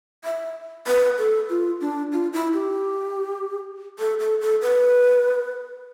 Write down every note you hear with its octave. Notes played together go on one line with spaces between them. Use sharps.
E5
B4
A4
F4
D4
F4
E4
G4
A4
A4
A4
B4